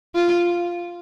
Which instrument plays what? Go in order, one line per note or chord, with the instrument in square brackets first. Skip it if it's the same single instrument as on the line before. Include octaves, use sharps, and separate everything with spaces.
[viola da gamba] F4